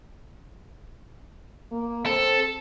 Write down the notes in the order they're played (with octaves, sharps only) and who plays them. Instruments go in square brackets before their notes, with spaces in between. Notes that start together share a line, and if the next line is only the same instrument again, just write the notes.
[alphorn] A#3
[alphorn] C4 [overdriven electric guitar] A4